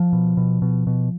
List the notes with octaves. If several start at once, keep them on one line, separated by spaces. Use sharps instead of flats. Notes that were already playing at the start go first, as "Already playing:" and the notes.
Already playing: F3
B2
B2
B2
B2